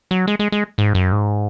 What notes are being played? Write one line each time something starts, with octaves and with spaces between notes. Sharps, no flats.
F#3
G#3
G#3
G#3
G#2
F#2
G#2